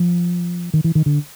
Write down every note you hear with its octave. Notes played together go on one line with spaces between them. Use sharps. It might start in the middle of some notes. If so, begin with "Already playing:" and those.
Already playing: F3
D#3
E3
D#3
D3